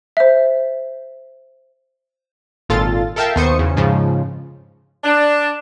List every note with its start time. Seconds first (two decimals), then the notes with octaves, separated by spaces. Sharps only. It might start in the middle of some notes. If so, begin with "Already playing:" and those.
0.17 C5 E5
2.69 G#1 A#2 F4 A4 A6
3.16 A4 A#4 E5 F5 G5 A5
3.36 D#2 B2 C5 C#6 D#6 C#7
3.59 E2 C#3
3.77 G#2 C#3 F3
5.04 D4